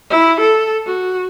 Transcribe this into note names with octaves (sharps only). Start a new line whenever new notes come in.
E4
A4
F#4